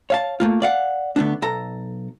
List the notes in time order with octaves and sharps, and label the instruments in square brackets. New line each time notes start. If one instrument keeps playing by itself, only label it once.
[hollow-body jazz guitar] C#5 F5 A5
A3 A#3 F4
D5 F5 F#5
D3 A3 B3 D4
B1 A4 A#5